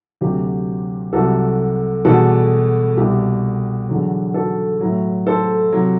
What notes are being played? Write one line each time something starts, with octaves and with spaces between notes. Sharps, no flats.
D2 C3 F#3 G4
C2 C3 F#3 F#4 A4
E2 B2 G3 F#4 A4
C2 B2 G3 G4
E2 D3 F#3
F#4 A4
A2 F#3
A4 C5
C3 F#3